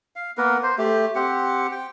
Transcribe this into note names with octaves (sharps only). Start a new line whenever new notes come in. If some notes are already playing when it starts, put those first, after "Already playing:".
F5
A#3 B3 A#4 B4
C5
A3 G4
C4 G4 F#5
G5